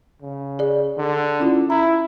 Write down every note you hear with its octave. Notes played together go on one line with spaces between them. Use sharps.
C#3
G#4 D5
D3
C#4 E4 F4
E4 A#5